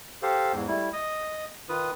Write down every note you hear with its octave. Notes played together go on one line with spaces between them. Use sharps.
G4 A4 C5 F5
E2 G#2
G3 A3 E4
D#5 D#6
D#3 F4 B4 D#6